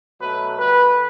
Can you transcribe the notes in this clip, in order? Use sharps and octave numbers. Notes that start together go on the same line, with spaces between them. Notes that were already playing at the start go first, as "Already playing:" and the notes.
B2 F#3 A3 B4
D3 G3 B4